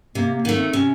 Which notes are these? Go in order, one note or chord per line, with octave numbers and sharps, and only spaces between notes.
C3 A#3
A#3
D#3 A3
C4
C3 C#4